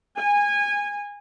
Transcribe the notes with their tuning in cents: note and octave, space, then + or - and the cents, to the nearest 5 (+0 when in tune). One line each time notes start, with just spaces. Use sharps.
G#5 -20